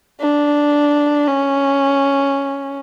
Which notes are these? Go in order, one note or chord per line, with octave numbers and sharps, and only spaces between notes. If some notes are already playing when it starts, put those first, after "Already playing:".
D4
C#4